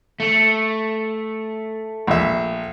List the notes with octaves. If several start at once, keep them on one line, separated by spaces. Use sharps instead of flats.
A3
A#1 E5